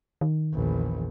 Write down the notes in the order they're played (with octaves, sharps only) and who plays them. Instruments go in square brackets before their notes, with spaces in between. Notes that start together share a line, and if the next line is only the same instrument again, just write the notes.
[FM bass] D#3
[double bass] A#1 E2